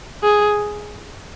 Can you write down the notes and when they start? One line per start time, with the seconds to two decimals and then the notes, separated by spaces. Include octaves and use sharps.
0.23 G#4